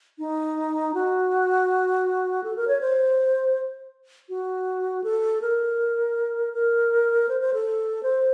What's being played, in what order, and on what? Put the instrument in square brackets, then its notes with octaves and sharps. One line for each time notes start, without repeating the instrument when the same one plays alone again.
[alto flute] D#4
F#4
A4
A#4
C#5
C5
F#4
A4
A#4
A#4
C5
C5
A4
C5